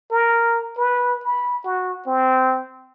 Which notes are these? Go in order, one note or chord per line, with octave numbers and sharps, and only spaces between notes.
A#4
B4
B5
F#4
C4